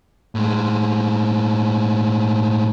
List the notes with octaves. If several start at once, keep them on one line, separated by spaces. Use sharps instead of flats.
A2 G#3